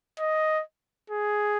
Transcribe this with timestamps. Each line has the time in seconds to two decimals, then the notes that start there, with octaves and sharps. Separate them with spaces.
0.20 D#5
1.11 G#4